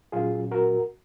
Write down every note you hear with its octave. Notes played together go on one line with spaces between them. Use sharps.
A#2 F#3 C#4 F4 G#4
F#4 A#4